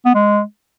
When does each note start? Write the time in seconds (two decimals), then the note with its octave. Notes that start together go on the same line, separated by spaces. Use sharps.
0.06 B3
0.15 G#3